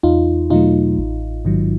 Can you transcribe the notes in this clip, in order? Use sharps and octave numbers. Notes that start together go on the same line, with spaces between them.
E2 D#4 F4
B2 F#3 A3 D#4 F4
A1
G#2 D#3 F#3